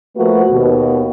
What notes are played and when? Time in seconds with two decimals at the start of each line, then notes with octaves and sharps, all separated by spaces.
0.16 F3 A3 A#3 F#4 A4 B4
0.50 D#2 B2